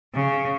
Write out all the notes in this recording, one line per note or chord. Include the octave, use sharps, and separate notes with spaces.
C#3